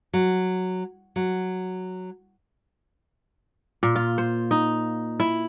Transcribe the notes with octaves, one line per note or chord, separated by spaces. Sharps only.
F#3
F#3
A#2
F4
C5
D#4
E4